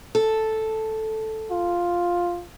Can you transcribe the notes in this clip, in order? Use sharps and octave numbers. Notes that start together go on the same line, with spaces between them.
A4
F4